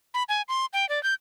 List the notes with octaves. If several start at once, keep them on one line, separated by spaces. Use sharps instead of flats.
B5
G#5
C6
G5
D5
G6